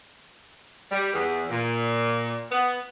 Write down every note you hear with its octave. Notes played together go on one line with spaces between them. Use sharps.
G3
E2
A#2
B3